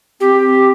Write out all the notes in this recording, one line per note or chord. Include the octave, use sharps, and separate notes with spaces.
C4 G4